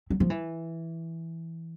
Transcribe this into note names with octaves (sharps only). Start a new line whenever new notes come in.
F#3
F3
E3